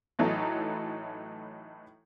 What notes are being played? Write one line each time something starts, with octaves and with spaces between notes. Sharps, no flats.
A2 E3 F#3 D#4 A4